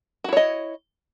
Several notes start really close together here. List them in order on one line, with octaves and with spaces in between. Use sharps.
F#4 E4 C#5 D#5